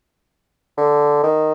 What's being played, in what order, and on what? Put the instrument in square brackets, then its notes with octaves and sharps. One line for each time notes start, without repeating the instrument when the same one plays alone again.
[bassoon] D3
D#3